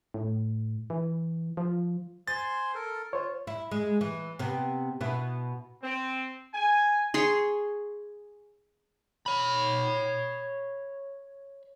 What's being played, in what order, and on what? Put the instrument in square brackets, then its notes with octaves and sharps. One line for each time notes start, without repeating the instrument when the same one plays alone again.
[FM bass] A2
E3
F3
[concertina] C5 G#5 C6 [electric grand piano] A6
[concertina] A4 A#4
[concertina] F4 [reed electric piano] C5 C#5
[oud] E4
G#3
E3
C3 B3
B2 B3 E4
[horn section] C4
G#5
[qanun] G#4 C#5 C6
[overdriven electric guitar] C#5 B5